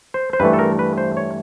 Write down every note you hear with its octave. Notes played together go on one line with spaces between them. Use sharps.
C5
C5
G2 E3 A3 B4
A4
A#4
B4
C5
C#5